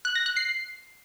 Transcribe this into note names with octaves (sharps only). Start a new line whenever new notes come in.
F#6
A#6
F#6
C7